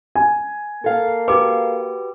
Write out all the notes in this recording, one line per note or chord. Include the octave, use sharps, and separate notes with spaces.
G#5
A#3 A4 F5
F#4 G4 B4 D6